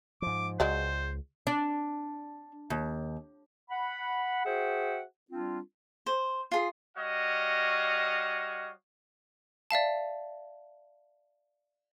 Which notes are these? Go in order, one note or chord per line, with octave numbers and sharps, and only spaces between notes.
G#2 F3 D6
C#2 F#3 G#3 C5 D5
D4
D#2
F#5 B5
F#4 G#4 C5 E5 F#5 G5
G3 C4 D4 F4
C5
F4 G#4
G3 F#4 C#5 D#5 F5
D5 E5 F5 A5